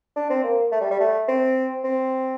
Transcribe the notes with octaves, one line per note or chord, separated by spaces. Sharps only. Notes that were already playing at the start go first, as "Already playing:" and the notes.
D4
C4
A#3
A3
G3
G3
A3
C4
C4